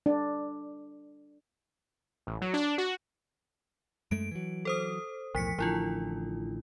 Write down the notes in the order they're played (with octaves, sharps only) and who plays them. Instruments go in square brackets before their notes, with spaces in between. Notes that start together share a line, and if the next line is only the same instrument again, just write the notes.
[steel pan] D4
[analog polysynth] A1
F#3
D4
F#4
[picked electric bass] F#2 G#3 A3 [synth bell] D7
[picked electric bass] E3 F#3
[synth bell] A4 C5 D#6
[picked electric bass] B1 E2 A2 [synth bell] F3 B6 C#7
[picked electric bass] A1 D3 [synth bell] F3 E4 F4